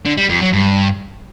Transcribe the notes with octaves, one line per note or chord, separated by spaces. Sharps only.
D3
G3
F2
F#3
G2